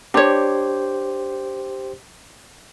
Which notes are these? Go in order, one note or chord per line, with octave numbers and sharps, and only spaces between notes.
D4 G4 C5 C#5